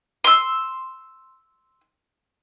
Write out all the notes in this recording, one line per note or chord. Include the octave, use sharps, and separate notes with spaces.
C6 E6